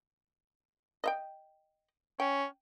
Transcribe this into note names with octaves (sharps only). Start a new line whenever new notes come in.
D#5 E5 G5
C#4 G5